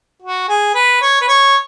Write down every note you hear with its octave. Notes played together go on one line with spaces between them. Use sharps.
F#4
G#4
B4
C#5
B4
C#5